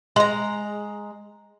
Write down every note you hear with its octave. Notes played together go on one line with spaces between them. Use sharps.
G#3 A#5